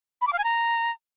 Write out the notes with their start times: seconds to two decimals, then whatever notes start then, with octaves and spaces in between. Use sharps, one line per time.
0.21 B5
0.27 D6
0.33 F5
0.38 G#5
0.44 A#5